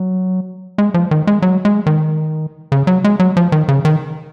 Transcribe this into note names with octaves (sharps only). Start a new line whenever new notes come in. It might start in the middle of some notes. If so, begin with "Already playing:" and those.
Already playing: F#3
G#3
F3
D#3
G#3
F#3
G#3
D#3
C#3
F#3
G#3
F#3
F3
D#3
C#3
D#3